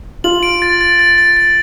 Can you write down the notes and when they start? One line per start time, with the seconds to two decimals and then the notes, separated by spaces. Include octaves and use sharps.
0.24 F4 F#7
0.43 D7
0.62 A6
0.81 A6
0.99 A6
1.18 A6
1.37 A6